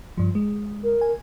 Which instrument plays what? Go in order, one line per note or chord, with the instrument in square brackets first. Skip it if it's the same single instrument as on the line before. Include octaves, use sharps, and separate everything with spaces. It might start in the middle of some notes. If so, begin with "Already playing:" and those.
[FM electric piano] G2 F3
G#3
[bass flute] A#4
[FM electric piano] G#5